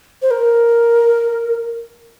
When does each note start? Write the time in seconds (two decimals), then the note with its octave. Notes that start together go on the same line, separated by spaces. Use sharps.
0.22 C5
0.31 A#4